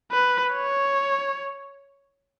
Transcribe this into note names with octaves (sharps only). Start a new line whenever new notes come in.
B4
C#5